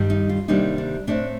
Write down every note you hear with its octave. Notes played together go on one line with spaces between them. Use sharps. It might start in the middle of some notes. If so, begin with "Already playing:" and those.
Already playing: G2 D#3 G3 D4
D#4
F4
C3 D#3 G3 A#3 D4 D#4
D4
A2 A3 C4 D4